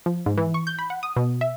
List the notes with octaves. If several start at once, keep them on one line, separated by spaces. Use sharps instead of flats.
F3
G#2
E3
C#6
G6
B5
F#5
D#6
B2
E5